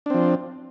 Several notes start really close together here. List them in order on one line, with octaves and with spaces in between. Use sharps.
D4 C4 F3